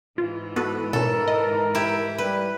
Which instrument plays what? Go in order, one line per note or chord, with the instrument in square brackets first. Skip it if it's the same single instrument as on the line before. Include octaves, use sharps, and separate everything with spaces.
[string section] G#2 E3 [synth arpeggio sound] F4
[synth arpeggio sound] B3 F#4 A4 [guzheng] B4
[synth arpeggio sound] B2 C#4 [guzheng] A4 [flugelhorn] A#4
[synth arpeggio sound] D#5
[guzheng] E4 G4 E5
[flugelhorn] G3 [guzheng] B4